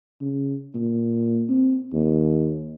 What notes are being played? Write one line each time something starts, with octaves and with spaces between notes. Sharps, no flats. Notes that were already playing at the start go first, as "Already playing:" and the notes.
C#3
A#2
C4
D#2